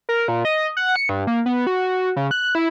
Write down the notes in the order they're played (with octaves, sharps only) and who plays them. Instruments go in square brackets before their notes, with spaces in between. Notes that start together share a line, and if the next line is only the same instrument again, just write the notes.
[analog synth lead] A#4
A#2
D#5
F#5
C#7
G2
A#3
B3
F#4
C#3
F#6
E4